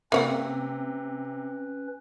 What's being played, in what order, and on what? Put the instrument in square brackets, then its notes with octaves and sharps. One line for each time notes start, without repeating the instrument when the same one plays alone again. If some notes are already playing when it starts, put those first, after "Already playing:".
[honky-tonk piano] C3 [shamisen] A#3 C#5 F#5 [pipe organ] C#4 B4 [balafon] E5